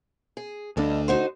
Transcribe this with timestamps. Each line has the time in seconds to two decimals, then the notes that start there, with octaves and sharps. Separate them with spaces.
0.37 G#4
0.77 D2 G2 D4 A4 D#5
1.08 D#4 F#4 C5